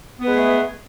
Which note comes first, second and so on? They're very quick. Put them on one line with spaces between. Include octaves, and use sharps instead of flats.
B3 B4 G#3 G#4 A3